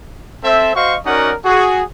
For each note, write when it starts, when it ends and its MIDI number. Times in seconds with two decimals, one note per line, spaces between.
0.44 0.73 60
0.44 0.73 69
0.44 0.73 72
0.44 0.73 76
0.76 0.97 66
0.76 0.97 72
0.76 0.97 75
0.76 0.97 77
0.76 0.97 85
1.06 1.33 61
1.06 1.33 63
1.06 1.33 66
1.06 1.33 70
1.06 1.33 74
1.06 1.33 78
1.45 1.83 66
1.45 1.83 68